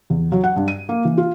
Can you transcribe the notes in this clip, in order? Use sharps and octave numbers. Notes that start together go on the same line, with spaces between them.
E2
F#3
F#5
G2
D#7
A#3
E3
F4